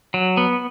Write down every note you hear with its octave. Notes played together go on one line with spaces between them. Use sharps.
F#3
B3